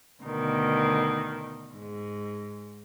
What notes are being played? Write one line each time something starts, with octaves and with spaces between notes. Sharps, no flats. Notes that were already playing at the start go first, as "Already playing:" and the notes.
D2 B2 D#3
G#2